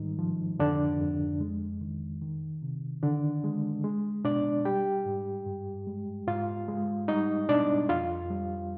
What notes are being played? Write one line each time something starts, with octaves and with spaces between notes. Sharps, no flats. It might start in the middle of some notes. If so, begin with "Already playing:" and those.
Already playing: G#2 D#3 G3 D#4
F3
F2 D3 D4
F2
G#3
D#3
D#3
C3
D3 D#3 D4
G#3
G#3
B2 D4 D5
G3 G4 G5
G#2
G2
G#3
G#2 F4 F5
G#3
G3 D#4 D#5
B2 D4 D5
F2 F4 F5
G3